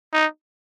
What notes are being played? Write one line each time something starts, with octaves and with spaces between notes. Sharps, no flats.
D#4